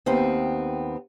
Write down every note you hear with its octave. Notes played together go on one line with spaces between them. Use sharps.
D#2 B3 C4